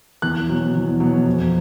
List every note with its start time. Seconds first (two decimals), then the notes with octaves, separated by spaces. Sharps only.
0.22 E2 F#6
0.49 B2 F#3
0.75 E2
1.00 B2 F#3
1.26 F2